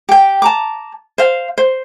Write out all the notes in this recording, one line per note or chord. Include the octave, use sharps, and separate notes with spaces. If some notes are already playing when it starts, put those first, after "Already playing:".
G4 G5
A5 A#5 D6
C5 F5
C5